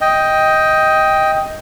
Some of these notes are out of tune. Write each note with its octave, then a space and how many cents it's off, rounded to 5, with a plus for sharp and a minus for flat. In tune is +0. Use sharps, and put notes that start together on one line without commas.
D#5 +10 G5 +0